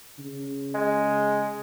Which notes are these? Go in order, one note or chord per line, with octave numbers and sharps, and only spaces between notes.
C#3
G#3